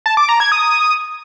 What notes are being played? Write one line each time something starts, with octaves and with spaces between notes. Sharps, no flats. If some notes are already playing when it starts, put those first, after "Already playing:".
A5
D6
A#5
G#6
D#6